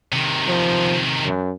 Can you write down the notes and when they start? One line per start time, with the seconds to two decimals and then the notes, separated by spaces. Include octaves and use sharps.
0.12 C3 D#3
0.48 F3
1.25 F#2